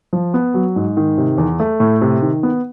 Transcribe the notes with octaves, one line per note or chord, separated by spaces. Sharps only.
F3
B3
F#3
G#2
D#3
C3
E2
A3
A2
C3
D#3
B3